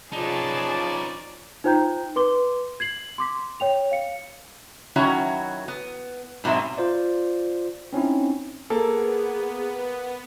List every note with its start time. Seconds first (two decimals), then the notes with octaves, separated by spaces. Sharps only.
0.12 F3 C#4 D#4 G#4 B4 D5 A5
1.64 D#4 F4 C5 G5 A#5 G6
2.16 B4 C6 D6 G7
2.80 G#6 C7 F#7
3.18 C6 D6 B6
3.60 C#5 G5 F7
3.91 F5 C#7
4.96 D#3 F#3 C#4 E4 F#4 C#5
5.68 B3
6.44 G#2 B2 F#3 C4 E5
6.78 F4 C5 D5
7.93 C4 C#4 D#4 E4
8.70 A#3 B3 G#4 A4